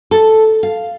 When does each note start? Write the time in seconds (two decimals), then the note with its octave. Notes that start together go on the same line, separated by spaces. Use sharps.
0.11 A4
0.63 F5